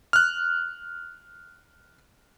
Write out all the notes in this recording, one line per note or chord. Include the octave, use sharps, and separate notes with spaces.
F6 F#6